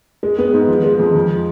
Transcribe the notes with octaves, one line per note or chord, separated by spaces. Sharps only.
G#3
B3
G#2
F3
G#3
F2
F3